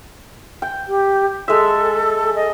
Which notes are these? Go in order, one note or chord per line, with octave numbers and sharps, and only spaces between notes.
G5
G4
G#3 A4 E5
D#5